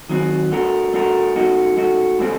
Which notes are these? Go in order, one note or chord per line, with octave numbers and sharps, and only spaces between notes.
D#3 F#3 C4
A3 D4 F#4 A#4
A3 D4 F#4 A#4
A3 D#4 F#4
A3 D#4 F#4
A2 A3 C4 G4